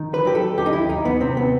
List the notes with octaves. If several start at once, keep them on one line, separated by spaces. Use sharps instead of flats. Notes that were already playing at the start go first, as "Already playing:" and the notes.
Already playing: D#3
B4
F#3 G4
A4
D#2 G4
D#4
E4
D#2 D#4
B3
C3 C4
B3